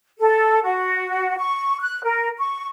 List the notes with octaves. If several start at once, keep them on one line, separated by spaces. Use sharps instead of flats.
A4
F#4
C#6
F#6
A#4
C#6